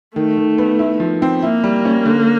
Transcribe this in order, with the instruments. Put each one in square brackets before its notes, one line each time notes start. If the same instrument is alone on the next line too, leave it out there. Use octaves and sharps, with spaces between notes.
[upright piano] D#3 [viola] A3
[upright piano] D#3
B3
E4
F3
C4
[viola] A#3 [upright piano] E4
[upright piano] G3
C#4
D3